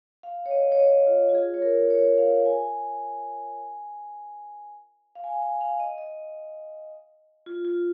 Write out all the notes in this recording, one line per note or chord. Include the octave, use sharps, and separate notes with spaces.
F5
C#5
D#5
C#5
D#5
F4
F4
G#4
C#5
A#4
C#5
F5
G#5
F5
G#5
G#5
F5
D#5
D#5
F4
F4